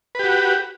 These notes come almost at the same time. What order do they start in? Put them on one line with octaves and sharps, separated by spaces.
B4 G4 F#4